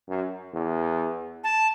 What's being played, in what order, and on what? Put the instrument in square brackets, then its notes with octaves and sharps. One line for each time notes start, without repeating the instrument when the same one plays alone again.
[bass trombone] F#2
E2
[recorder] A5